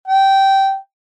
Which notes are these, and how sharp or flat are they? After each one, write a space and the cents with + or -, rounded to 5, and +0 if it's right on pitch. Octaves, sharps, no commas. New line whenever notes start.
G5 -15